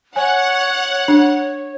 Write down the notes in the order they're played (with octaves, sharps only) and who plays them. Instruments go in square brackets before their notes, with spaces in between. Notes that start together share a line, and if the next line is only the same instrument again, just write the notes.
[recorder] C#5 [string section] F#5 [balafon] G#5
[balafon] D4